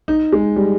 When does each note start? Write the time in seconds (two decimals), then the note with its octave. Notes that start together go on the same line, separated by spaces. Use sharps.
0.08 D#4
0.32 G#3
0.56 G3